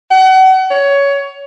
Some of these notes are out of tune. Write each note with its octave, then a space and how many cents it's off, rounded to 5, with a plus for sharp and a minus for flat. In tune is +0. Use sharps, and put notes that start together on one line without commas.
F#5 +35
C#5 +15